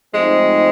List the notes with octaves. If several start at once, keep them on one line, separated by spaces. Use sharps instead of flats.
G#2 F3 G#3 A3 C4 D#4